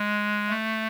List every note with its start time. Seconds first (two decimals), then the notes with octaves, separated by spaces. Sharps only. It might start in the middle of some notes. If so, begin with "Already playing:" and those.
Already playing: G#3
0.50 A3